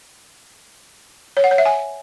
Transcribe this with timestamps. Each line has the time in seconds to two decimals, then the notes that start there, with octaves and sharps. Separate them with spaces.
1.37 C#5
1.44 F#5
1.51 C#5
1.58 E5
1.66 G#5